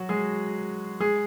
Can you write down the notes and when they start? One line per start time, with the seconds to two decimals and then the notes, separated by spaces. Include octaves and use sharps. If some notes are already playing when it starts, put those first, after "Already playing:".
Already playing: F#3 F#4
0.09 G#3 G#4
1.00 G#3 G#4